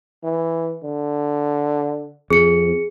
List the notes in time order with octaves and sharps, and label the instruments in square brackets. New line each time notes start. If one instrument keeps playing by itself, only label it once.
[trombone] E3
D3
[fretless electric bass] F2 [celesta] G#4 C#7